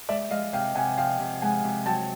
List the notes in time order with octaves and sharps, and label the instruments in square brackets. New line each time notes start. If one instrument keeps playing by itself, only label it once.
[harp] G#3 [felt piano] D5 E5
[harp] G#3 [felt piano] D#5 F5
[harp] C3 [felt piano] F5 G5
[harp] C3 [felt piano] F#5 G#5
[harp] F3 [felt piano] F5 G5
[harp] C3
[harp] G#3 [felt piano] F#5 G#5
[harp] C3
[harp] F#3 [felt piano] G5 A5